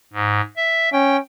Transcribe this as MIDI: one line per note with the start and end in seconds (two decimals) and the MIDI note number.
0.13 0.41 44
0.57 0.89 76
0.93 1.19 61
0.93 1.17 79